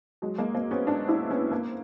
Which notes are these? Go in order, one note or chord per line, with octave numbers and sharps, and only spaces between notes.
F#3 G#3
G#3 A#3
A#3 C4
B3 C#4
C4 D4
D4 E4
B3 C#4
A#3 C4